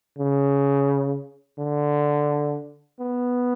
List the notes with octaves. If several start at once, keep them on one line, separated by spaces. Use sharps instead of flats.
C#3
D3
B3